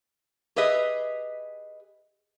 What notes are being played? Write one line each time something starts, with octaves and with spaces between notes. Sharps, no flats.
G4 G#4 B4 D#5 E5